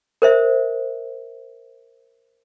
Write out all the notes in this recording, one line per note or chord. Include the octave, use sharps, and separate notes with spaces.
A#4 C5 E5